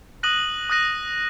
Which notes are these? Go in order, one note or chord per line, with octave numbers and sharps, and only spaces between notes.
D#6 F#6 A#6 D#7 F#7
D#6 F#6 A#6 D#7 F#7